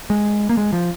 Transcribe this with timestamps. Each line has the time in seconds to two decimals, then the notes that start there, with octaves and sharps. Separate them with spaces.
0.10 G#3
0.49 A#3
0.57 G#3
0.73 F3